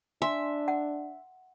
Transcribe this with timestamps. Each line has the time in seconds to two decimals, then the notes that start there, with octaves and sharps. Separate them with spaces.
0.22 D4 E5 G#5 C6
0.68 F#5